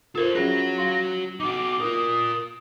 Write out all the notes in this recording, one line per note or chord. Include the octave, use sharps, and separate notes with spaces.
F4 A4 A#4 C5
F#3 C#4 F#4 G#4 C#5 A#6
F5 C6
D#4 F#4 D6
F4 A#4 D#6